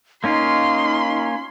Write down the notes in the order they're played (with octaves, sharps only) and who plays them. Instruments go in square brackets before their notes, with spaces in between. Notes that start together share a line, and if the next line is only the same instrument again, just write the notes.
[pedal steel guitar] A#3 C#4 F4 [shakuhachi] D#4 [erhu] C6